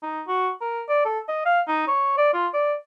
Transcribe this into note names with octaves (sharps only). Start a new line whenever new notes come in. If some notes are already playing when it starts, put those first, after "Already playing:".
D#4
F#4
A#4
D5
A4
D#5
F5
D#4
C#5
D5
F4
D5